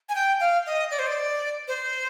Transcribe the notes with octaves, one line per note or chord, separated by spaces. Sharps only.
G#5
G5
F5
D#5
D5
C5
D5
C5